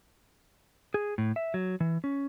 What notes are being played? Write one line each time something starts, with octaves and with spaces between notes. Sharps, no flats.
G#4
A2
E5
F#3
E3
C#4